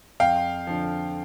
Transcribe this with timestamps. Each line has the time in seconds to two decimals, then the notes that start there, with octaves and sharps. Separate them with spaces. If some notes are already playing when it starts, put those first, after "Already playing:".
0.20 F2 F5 G5
0.67 D3 F3